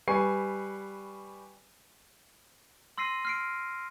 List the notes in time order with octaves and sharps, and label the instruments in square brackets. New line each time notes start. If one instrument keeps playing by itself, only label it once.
[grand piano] G3 B4 G#5 C#6 C7
[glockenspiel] C6 E6 A#6 C7 D#7
F6 C7 D7